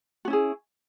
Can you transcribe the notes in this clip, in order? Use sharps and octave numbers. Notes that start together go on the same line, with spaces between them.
C#4 E4 F#4 G#4